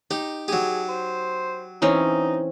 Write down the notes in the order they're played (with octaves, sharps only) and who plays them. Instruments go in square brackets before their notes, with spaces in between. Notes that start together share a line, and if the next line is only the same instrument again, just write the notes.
[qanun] D#4 [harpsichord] G4
[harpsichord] F#3 G4 [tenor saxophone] G#4
[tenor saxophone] C5
[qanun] E3 C4 C#4 [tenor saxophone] D#4